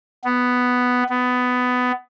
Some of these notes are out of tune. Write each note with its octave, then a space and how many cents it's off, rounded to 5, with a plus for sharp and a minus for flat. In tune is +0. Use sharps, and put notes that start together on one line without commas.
B3 +5
B3 +15